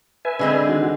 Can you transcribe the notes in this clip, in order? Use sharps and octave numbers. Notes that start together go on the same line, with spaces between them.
B4 E5 G#5
D3 G#3 C4
D#3 F#4